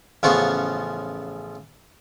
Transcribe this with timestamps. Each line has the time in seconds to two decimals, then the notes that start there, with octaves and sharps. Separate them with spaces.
0.23 A1 C#3 F3 B3 F4 C#6